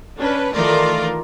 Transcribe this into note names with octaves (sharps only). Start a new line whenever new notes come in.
C#4 D4 B4
D#3 E3 A3 F4 A#4 D5